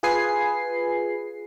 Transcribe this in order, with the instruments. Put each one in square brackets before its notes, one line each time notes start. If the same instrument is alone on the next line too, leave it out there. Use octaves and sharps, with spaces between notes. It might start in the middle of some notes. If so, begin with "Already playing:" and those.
[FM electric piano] F4 G#4 B4 G#5 C7